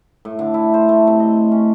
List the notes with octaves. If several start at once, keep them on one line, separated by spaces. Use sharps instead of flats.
A2
D3
E4
C5
A3
C3
D#5
C#4